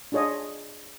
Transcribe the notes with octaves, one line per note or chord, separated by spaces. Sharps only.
D4 F4 G#4 C#5 D#5